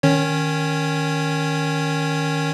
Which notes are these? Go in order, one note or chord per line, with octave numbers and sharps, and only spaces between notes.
D#3 C#4 C#5